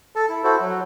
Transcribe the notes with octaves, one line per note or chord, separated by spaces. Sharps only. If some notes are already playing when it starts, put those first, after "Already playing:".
A4 A5
E4
E4 F#4 A4 C5
F#3